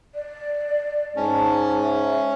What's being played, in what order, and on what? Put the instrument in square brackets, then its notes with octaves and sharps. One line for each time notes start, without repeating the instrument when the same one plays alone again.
[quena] D5
[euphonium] G#2 [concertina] C#4 [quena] A5
[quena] E5